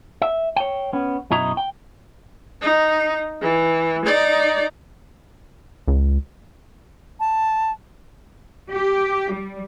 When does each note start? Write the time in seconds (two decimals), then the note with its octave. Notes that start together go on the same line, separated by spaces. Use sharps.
0.22 E5
0.56 C#5 G5
0.93 B3 C#4
1.31 F#2 B2 E4 D#5 A#5
1.57 G5
2.61 D#4
3.41 E3
4.05 D#4 D5
5.88 C#2
7.20 A5
8.72 G4
9.33 G3